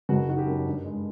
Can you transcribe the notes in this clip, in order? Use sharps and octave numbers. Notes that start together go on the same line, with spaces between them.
F#1 F#4
D#3 F#4
G4
F#2
G2
G#3